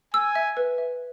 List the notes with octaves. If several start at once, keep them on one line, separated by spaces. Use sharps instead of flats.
G#5 E6
E5
B4
E5